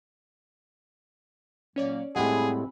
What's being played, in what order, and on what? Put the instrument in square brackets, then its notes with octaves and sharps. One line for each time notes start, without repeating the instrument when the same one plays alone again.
[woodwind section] A#2 F#3 A#3 [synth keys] C#4 C#5 D5
[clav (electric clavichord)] A2 G3 G#3 [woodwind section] C4 [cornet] G#4 [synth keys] F#5 G#5 B5